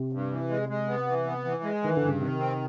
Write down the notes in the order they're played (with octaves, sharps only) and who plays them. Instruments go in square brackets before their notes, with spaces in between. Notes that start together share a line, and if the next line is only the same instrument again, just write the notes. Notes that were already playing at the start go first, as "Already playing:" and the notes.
Already playing: [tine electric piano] C3
[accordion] G2
E3
G#3
G#3
B3
E3
B3
E3
G#3
[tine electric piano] D#3 [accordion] E3
[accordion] G2 [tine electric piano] D3
[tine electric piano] C#3
[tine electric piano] C3 [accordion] D#3
[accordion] C4